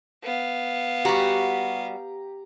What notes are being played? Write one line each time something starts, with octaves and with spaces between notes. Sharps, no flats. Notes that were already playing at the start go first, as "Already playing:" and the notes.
B3 F5
G3 F#4 G4 A#5